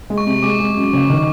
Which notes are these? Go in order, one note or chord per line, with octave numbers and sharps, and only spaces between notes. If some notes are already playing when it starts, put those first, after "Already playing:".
G#3
C#6
C3
G#3 D6
G#3
F#2
F#1
D#3